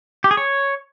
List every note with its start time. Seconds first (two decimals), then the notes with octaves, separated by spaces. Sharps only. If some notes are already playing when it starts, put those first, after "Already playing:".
0.24 G4
0.31 G#4
0.37 C#5